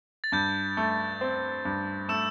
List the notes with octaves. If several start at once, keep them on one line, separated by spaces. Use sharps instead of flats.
A6
G2 G6
A3
C4
G2
A3 E6 E7